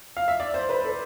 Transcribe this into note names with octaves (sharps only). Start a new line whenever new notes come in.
F5
E5
D5
C5
B4
A4